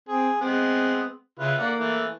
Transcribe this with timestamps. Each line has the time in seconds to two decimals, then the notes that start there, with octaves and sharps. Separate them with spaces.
0.09 C4 G#4
0.41 G#3 B3 C4
1.39 C#3 E4 F4 B4
1.59 A#3 D5 F#5
1.78 E3 A3